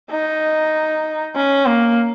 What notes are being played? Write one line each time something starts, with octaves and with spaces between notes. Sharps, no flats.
D#4
C#4
A#3